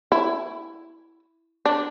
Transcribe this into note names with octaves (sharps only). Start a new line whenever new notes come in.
E4
D4